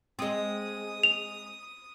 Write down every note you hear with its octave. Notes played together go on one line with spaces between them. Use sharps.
G#3 C4 D#6
F7